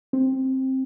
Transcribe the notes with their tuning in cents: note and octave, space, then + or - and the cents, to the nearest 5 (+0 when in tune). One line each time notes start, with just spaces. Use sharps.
C4 +10